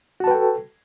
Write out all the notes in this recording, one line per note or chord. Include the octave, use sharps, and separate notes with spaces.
F#4 A4 B4 G5 A5